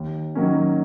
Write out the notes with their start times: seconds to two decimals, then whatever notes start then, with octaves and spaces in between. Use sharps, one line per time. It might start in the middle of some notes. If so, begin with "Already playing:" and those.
Already playing: D#2
0.35 D#3 F#3 A#3 C#4